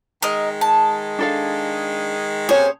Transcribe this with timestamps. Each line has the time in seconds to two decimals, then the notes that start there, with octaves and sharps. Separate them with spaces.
0.22 D#3 G#3 A#4 D#5
0.61 A5
1.19 D4 A4 F5
2.49 C3 A#3 C#4 G#4 C5 C#5 G#5